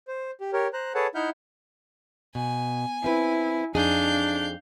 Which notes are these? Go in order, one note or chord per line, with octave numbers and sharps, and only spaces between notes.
C5
G4
G4 A#4 C#5
C5 A#5 F#6
G#4 A4 B4 C#5 F#5 A5
D#4 E4 E5 F#5 F6 G6
B2 G#5
C4 E4 B4
F2 D4 D#4 G#4 F5 G6